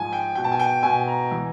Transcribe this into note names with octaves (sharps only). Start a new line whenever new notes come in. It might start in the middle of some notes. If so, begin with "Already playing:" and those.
Already playing: G#2 F3 G#5 A5
G5
B2 G5
A5
G#5
G5
B2 G#5
A#5
E3